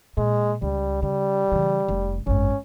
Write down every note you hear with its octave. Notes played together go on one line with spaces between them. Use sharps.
A#2 G#3
C#2 G3
C#3 G3
C#3 E3
F1
G#1 F#2 C#4